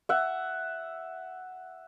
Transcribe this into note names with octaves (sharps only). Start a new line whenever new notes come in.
E5 F#5